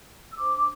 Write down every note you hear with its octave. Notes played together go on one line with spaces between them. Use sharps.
E6
D4 C5 D6